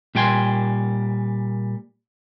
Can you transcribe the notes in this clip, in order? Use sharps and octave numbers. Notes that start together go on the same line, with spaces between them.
A#2 G3 G5 G#5 C6